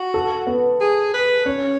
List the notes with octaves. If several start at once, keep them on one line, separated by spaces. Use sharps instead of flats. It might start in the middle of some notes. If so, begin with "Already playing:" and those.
Already playing: F#4
A4
B3
G#4
B4
C#4 C#5